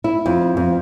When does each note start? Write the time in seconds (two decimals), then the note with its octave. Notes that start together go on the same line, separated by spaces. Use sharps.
0.04 E4
0.26 F2
0.57 F2